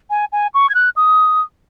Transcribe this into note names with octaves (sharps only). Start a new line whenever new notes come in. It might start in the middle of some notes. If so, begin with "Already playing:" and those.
G#5
G#5
C#6
G#6
F#6
D#6